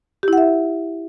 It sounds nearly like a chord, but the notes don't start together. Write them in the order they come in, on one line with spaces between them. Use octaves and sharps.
G4 E4 F#5 E5